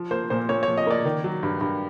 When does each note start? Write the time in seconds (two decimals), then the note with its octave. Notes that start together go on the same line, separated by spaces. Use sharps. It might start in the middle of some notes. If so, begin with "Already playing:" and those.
Already playing: F3
0.11 A#3 C5
0.30 A#2 C5
0.49 A#2 C#5
0.63 C#5
0.67 F3
0.77 D#5
0.87 A#3 D5
1.05 D#3
1.24 F#3
1.43 G2
1.61 G2